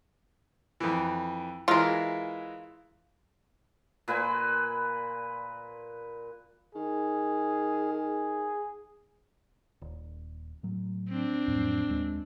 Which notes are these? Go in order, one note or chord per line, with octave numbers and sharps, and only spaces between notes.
F2 E3
E3 G#3 E4 F4 A#4
A#2 B4 G#5 C6
D#3 G#4
G#4
D#1
A2 F#3
C4 D4
F2 A2 F#3
D#2 G#3